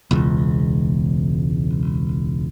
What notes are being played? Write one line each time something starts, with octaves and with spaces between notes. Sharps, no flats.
E1 C#2